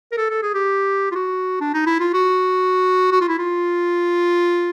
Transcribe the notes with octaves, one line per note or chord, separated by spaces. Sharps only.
A#4
A4
A4
G#4
G4
F4
F#4
D4
D#4
E4
F4
F#4
F#4
F4
E4
F4